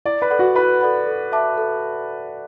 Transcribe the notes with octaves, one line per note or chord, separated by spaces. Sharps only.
E4 D5
B4
A4 D5 F#5 B5
F#4
E4 B4
A4 D5 F#5 B5
A4
E5 A5 D6
A4